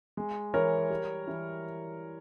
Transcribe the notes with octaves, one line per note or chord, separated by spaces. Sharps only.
G#3
E3 A#4 C#5
G3
E3